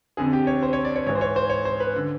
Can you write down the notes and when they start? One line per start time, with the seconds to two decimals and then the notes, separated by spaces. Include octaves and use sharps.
0.17 F2 D3 G#4
0.33 G4
0.47 C#5
0.63 C5
0.73 C#5
0.85 D5
0.96 C#5
1.07 G#2 E3 C#5
1.15 C5
1.21 C#5
1.36 C5
1.50 C#5
1.65 C5
1.80 B4
1.96 D3